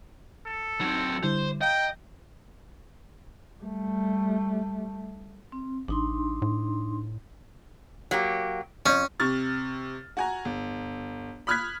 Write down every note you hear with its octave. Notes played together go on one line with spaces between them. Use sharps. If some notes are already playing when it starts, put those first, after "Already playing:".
A4
F#3 C4 D#4
D3 G3 E4 C5
D#5 F5 G5 A#5
G3 A3
C4
A1 D4 D#4 C6
A2
F#3 A#3 G4
F2 C#4
C3 C#6 F6 A6
F#4 G#5 A#5
G1
B5 D#6 F6 F#6 G#6 B6